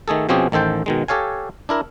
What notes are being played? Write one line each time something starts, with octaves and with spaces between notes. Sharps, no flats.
D#3 A3 G#4 A4
B2 F3 C4 C#4 G4 G#4
A1 D#3 A4 C5 G5
B2 D#3 G#3
G4 A4 C#5 F5 G#5
D4 E4 A#4